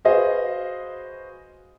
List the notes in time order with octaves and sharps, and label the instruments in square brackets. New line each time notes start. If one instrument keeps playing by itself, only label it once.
[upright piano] F#4 G#4 B4 C5 D#5 F5